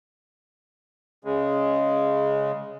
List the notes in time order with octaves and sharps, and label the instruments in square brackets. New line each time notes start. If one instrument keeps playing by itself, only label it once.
[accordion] C#3 G#3